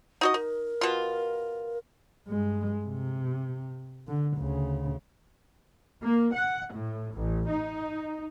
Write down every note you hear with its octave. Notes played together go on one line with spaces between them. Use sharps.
D#4 F#4 D#5
D#4 A#4
B2 F4
G2 G#3
C3
D3
D2 C#3
A#3
F#5
A2
A1
D#4